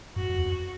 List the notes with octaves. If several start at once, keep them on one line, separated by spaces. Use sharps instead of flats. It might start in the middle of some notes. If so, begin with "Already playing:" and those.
G2 F#4
F#2
E2
F2